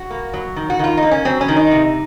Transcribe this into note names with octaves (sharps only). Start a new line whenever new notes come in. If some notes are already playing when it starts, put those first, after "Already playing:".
Already playing: F#4
A#3
F#3
D#3
F#4
D#3 F4
D#4
A#3
C#4
F#3 C4
C#4
D#3
D#4
C3